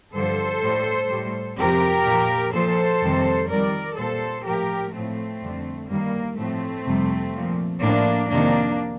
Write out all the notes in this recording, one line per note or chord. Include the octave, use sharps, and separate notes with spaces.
G2 D3 F3 A4 C5
A2 G3
A2 G3
F2 C3 F3 G4 A#4
A#2 F3
A#2 F3 A4 C5
F2 C3 D#3 G3
F2 D#3 G3 A#4 D5
A#2 G3 A4 C5
A2 F3 G4 A#4
A2 F3 A3 C4
F2 D3 G3
G2 D#3 G3 A#3
A2 F3 A3 C4
F2 C3 G3
A#2 F3
A2 F3 A#3 D4
F2 C3 D#3 A#3 D4